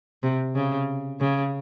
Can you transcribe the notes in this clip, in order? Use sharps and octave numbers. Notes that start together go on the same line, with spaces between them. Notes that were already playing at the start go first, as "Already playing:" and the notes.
C3
C#3
C#3